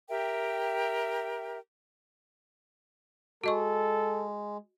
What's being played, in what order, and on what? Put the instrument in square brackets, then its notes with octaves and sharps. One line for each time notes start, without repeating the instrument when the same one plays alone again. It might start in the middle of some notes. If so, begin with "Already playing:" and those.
[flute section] G4 A#4 E5 G5
[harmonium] G#3 [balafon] F#4 D#5 C#6 [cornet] A4